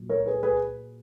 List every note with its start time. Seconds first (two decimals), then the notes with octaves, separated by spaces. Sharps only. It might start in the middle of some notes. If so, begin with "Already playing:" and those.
Already playing: A#2 F#3
0.09 A#4 C#5
0.26 G#4 B4
0.43 G#4 B4